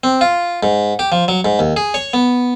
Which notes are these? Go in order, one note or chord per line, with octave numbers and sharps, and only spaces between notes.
C4
F4
G#2
G4
F3
F#3
G#2
D#2
G#4
C#5
B3